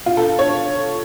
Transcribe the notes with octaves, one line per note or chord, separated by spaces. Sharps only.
F4
A4
C#5